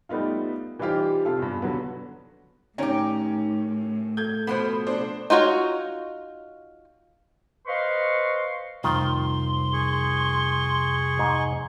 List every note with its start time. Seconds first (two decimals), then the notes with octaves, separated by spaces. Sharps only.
0.09 G3 A3 B3 D#4 F4
0.79 E3 G3 D#4 F4 G4 C5
1.25 C3 F4 A4
1.39 E2 G2
1.62 D3 F#3 B3
2.78 A2 D#3 C#4 D#4 G4
4.17 A4 G6 G#6
4.47 B2 F3 B3 C5 B5
4.87 D4 C5
5.30 D#4 F4 F#4 C#5
7.67 B4 C5 D#5 F5 C6 C#6
8.84 C2 F2 D#3 F4 C6
9.73 G#4 C#6
11.19 G#2